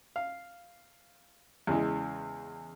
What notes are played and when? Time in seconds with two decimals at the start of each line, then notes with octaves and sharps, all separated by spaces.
0.16 F5
1.67 E2 C#3 E3 G#3